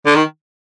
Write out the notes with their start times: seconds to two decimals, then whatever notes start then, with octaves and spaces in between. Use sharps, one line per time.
0.06 D3
0.16 D#3